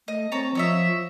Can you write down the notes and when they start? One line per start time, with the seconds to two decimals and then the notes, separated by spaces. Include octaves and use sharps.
0.08 A3 D#5
0.32 C4 C#5 A5 A#5
0.55 F3 C#5 D#5 E5